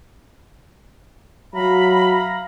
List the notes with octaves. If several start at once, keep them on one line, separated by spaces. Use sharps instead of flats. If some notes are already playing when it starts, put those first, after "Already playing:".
F#3 E5 F5 A#5 B5